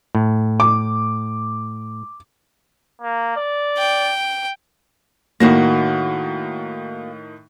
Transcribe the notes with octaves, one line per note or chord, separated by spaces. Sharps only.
A2
D6
A#3
D5
G5
A2 D#3 A#3 F#4 F#5 A#6